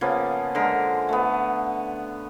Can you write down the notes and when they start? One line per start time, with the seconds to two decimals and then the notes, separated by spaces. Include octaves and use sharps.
0.01 C#3 F3 A#3 B3
0.55 D3 G#3 A#4
1.09 A3 B3